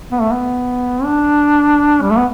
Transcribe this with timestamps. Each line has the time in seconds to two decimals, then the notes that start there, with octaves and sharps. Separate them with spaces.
0.12 B3
0.21 A3
0.32 B3
1.04 D4
2.02 G3
2.11 A3
2.18 B3